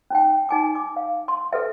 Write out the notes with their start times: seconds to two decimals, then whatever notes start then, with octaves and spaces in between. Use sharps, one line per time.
0.10 C#4 D#4 G5
0.49 D#4 G#5 D6
0.75 D6
0.96 F5
1.28 C6
1.53 A4 B4 E5